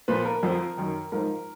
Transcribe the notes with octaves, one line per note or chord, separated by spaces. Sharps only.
A#2 F3 B4
A#4
F2 F3
F#2 D#3
G#2 F3 A#4